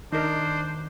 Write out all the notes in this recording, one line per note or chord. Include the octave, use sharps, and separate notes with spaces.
D#3 D4 D#4 A#4 C5